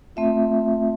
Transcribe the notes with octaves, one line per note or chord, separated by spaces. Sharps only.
A3 C4 F4 E5